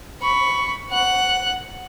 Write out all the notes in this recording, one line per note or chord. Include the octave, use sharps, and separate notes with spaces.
B5 C#6
F#5 F#6